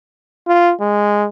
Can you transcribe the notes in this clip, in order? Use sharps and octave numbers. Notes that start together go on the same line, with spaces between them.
F4
G#3